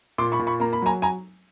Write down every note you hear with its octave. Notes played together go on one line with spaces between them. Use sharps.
A#2 C6 D6
B5 C#6
A#2
B5 C#6
A#3 A#5
B5
F#3 G#5 A#5
G#5 A#5